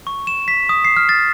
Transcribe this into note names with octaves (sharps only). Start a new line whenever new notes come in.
C#6
E7
B6
D#6
C7
F6
A6